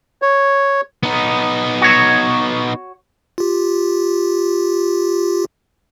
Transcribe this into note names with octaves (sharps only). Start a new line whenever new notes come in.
C#5
B3 D#4
F#4 C#5
F4 G4